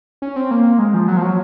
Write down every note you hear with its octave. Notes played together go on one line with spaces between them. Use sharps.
C#4
C4
A#3
G#3
F3
F#3
F3
F#3